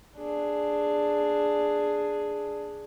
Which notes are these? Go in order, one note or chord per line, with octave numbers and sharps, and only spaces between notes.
D4 G#4